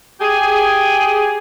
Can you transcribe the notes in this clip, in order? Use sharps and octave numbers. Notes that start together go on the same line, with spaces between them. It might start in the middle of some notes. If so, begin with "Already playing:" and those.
G4 G#4